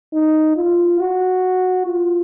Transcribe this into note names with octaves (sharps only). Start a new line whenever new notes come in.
D#4
F4
F#4
F4